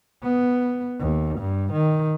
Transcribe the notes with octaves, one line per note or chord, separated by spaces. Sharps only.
B3
D#2
G2
D#3